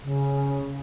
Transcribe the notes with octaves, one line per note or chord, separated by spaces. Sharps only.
C#3